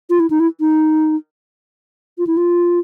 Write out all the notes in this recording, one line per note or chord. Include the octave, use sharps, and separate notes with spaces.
F4
E4
D#4
E4
D#4
F4
E4
F4